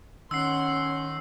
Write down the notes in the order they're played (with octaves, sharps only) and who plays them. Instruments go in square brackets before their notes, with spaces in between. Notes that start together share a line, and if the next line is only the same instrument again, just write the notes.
[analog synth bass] D#3 [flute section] C#4 [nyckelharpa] F#5 C6 [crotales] E6 C7